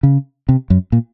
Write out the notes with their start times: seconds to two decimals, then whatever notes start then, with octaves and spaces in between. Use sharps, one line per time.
0.03 C#3
0.49 C3
0.70 F#2
0.92 A#2